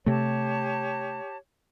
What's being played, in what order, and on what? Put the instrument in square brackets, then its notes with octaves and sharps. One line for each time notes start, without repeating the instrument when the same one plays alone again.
[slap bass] C3 A3 [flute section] G4 C#5 A5